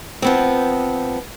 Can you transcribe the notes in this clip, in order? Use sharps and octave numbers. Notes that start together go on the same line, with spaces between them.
F3 B3 C4